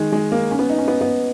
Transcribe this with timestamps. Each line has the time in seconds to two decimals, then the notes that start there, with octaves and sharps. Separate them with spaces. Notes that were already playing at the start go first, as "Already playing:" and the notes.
Already playing: D#3 G#3
0.12 G#3
0.32 A#3
0.51 C#4
0.59 B3
0.70 D#4
0.78 C#4
0.88 B3
1.01 B3